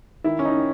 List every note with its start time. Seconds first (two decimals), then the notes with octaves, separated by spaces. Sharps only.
0.24 D#3 E4
0.39 C#4
0.45 D#4
0.57 D#3